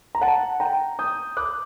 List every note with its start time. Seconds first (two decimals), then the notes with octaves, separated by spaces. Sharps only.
0.15 A#5
0.22 F#5 A5
0.60 G5 A#5
0.99 D#6 G6
1.37 D6 F#6